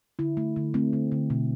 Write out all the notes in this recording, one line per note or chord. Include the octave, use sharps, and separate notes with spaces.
D3 E4
A3
D3
A3 C4
D3
D3
B2